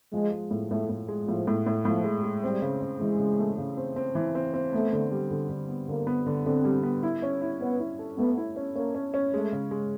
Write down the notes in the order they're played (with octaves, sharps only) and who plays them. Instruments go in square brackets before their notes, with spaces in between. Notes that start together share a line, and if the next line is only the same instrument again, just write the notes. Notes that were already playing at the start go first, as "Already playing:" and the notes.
[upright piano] F3 [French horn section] G#3
[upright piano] G#3
A2
[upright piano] A2 [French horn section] A3
[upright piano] A2
G#3
[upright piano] A2 [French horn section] F3
[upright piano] A2
A2
[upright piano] A2 [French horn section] F3
[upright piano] G#3
G#3
[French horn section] G3 [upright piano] C4
[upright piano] C#3
C#3
[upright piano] E3 [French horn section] G#3
[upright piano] C#3
A3
C#3
C4
C4
E3
C4
C4
[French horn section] A3 [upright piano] B3
[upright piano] D3
G3
D3
D3
B3
[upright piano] D3 [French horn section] A#3
[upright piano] B3
D3
[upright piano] D3 [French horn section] C4
[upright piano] G3
B3
E4
C#4
E4
[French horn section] B3 [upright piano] C#4
[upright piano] E4
A4
[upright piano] A3 [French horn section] B3
[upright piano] E4
C#4
[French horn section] A#3 [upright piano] C#4
[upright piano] C#4
C#4
[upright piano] G#3 [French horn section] A3
[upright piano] C#3
G#3